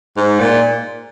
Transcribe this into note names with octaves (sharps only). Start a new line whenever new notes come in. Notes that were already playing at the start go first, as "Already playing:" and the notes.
G#2
A#2